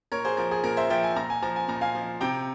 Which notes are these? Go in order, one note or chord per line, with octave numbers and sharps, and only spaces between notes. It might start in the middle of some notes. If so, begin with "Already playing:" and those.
A#2 A#4 C#5
G#4 C5
F3 A#4
G#4
A#2 A#4
C5 E5
F3 E5 G5
G#5
A#2 A#5
G#5
F3 A#5
G#5
A#2 A#5
F5 G#5
F3
C3 G5 A#5